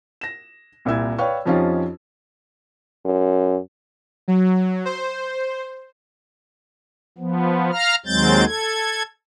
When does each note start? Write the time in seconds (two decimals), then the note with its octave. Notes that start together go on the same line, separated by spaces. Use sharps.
0.21 A#6 E7
0.85 C2 A#2 E4 E6 G#6
1.18 B4 C#5 D5 F5 G5 C#6
1.46 F2 F3 C#4 D#4 F4 G4
3.05 F#2
4.28 F#3
4.85 C5
7.18 F3 B3
7.72 F5 A#5 F6
8.06 D#2 F#3 G#3 C4 G6 A6
8.46 A4 G#6